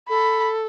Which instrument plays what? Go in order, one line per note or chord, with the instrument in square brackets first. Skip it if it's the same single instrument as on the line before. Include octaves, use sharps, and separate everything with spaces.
[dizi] A4 [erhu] B5